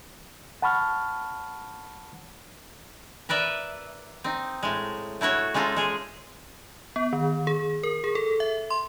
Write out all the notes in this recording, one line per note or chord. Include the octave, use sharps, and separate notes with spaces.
F#5 A5 B5 C#6 F6
A#4 B4 D5 E5
C4 D#4
A2 G#3
A3 E4 F#4 C#5
G#3 C#4 D#4 F4 A4
G#3 G#4
B3
D#3
G#4
A#4
G#4
A4
E5
C6